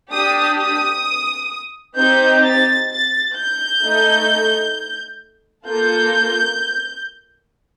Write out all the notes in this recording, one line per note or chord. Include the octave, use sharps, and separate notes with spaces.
D4 G4 D#6
D#6
C4 D#4 G4 G6
A6
A6
G6
A3 D#4 A4
A#3 F4 A4 G6